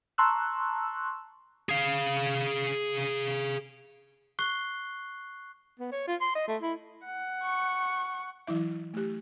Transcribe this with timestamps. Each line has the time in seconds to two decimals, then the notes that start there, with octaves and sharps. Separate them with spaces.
0.18 A5 A#5 C6 C#6 E6 F#6
1.69 G#4 F5
4.39 C#6 F#6 C7 G7
5.80 B3
5.92 C#5
6.07 F4
6.21 C6
6.35 D#5
6.48 A3
6.62 E4
7.05 F#5
7.43 C#6
8.47 E3 F#3 E4 E5
8.94 A3 G4